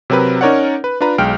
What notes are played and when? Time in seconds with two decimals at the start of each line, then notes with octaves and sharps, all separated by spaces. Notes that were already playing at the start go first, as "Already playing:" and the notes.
0.10 C3 F#3 C4 A#4 B4
0.41 C#4 D#4 A#4 C#5 D5 F#5
0.84 B4
1.01 D4 F4 B4 A#5
1.18 B1 G#3 G5 F6 D7